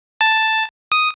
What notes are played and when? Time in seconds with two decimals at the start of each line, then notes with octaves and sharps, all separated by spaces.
0.21 A5
0.92 D#6